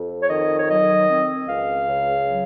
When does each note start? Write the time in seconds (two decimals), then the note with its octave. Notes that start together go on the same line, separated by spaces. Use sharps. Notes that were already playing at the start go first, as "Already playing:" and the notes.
Already playing: F2
0.22 C#5
0.30 D#3 D#5
0.58 C#5
0.69 F#3 D#5
1.08 C4
1.47 C#2 F5
1.87 C#3
2.27 F#3